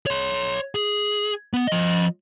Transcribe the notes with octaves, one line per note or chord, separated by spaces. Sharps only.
C#5 C6
G#4
B3
F3 D#5